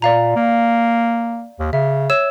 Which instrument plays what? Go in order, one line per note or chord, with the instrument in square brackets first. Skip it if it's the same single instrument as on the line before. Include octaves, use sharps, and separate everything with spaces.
[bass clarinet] A#2 [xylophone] D5 F5 A#5
[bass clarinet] A#3
D#2
[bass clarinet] C#3 [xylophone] E5
[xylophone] C#5 E6 E7